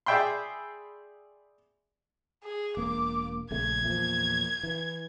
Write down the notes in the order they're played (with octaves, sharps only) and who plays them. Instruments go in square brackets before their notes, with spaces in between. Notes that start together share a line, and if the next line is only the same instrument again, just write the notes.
[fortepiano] G#4 D5 E5 G5 B5 C6
[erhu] G#4
[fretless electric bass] E1 A#3 [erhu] D6
[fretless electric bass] A#1 C#3 A3 [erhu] G#6
[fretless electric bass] E2 A#2 F3
E3